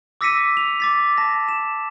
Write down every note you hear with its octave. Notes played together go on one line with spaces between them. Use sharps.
D6 E6 A#6 B6 C#7 D#7
F7
D6 A6 B6
A5 A#6
E7